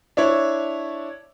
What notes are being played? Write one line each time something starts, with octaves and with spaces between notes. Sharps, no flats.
D4 E4 C#5